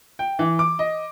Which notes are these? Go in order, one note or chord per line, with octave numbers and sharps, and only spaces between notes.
G5
E3
D6
D#5